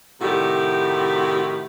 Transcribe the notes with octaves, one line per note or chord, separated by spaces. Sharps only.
A2 C3 D#3 E4 F#4 G4